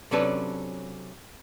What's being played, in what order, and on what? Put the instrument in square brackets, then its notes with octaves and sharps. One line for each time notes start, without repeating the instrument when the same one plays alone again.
[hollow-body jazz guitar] C3 F#3 C#4 D4 A4 B4